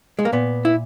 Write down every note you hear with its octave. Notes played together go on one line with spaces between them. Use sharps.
G#3
A#3
A#2 B3
E4